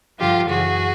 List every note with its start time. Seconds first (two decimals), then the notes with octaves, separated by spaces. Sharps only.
0.18 G2 D3 F3 F4 G4
0.48 F#2 C#3 E3 F#4 G#4